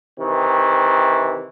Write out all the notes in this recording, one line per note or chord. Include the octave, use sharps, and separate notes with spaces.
C3 D#3 E3